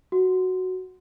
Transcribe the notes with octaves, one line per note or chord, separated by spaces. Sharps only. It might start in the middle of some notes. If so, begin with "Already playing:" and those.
F#4